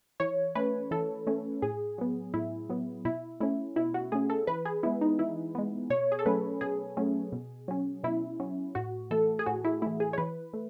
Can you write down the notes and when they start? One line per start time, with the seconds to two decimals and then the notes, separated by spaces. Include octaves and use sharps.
0.20 E3 C#5
0.55 A3 C#4 B4
0.91 E3 A4
1.27 A3 C#4
1.62 A2 G#4
1.98 F#3 B3
2.34 A2 E4
2.70 F#3 B3
3.05 B2 E4
3.40 A3 C#4 E4
3.76 B2 E4
3.94 F#4
4.12 A3 C#4 G#4
4.30 A4
4.47 E3 B4
4.65 G#4
4.83 G#3 B3 E4
5.01 D#4
5.19 E3 E4
5.55 G#3 B3
5.90 B2 C#5
6.12 G#4
6.19 A4
6.26 F#3 A3 C#4 B4
6.61 B2 G#4
6.97 F#3 A3 C#4
7.32 B2
7.68 F#3 C#4
8.04 B2 E4
8.40 F#3 C#4
8.75 A2 F#4
9.11 E3 A3 A4
9.39 G#4
9.46 A2 F#4
9.64 E4
9.82 E3 A3 E4
10.00 G#4
10.13 C#5
10.18 E3 B4
10.53 A3